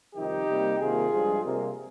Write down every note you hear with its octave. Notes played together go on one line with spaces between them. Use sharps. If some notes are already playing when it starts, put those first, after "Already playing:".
F2 C3 D#3 G3 D#4 G4
C3 G3 A#3
C3 D#3 A#3 F4 G#4
G2 F3 G#3
C3 G3 A#3